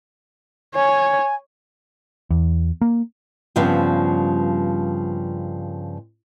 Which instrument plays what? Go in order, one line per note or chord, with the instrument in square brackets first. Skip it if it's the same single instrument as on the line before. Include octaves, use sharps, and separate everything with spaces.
[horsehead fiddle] C#5 [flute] G#5
[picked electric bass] E2
A#3
[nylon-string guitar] G2 C#3 F3 G3 B3 C4